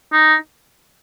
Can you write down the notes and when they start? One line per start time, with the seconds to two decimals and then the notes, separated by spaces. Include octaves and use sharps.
0.13 D#4